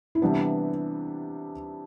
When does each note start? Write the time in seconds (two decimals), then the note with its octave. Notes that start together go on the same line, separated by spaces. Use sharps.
0.15 E4
0.22 C3 E3 G3 B3 D4